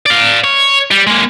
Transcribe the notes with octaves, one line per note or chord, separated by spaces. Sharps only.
D5 F5
C#5
G3
G#3 A#3